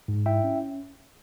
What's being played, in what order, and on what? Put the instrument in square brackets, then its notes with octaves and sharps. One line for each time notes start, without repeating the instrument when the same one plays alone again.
[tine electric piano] G#2
E4 E5 G5
C#4